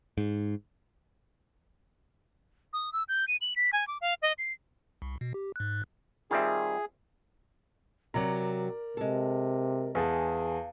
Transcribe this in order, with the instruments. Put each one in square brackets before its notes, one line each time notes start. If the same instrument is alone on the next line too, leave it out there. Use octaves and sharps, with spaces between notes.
[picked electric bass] G#2
[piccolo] D#6
E6
G6
D#7
F#7
B6
G#5
D6
F5
D#5
C7
[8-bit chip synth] C2
B2
G4
G#2 F#6
[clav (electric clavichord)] D#3 G3 C4 [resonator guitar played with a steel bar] F4 E5 [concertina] G#4
[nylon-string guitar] C3 F#3 [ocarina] A#4 [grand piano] D5 A#5
[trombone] C3 [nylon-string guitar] G#3 A4
[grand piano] E2 G#4 A5 [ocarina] F5